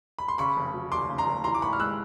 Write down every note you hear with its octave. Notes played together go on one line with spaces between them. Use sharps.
B5
C6
C#3 B5 C#6
F1
F#3
D#2 C6 D6
C#3
A#5 C6
F1
E3 A#5 C6
D6
G#1 B5 C#6
F6
G#3 E6 F#6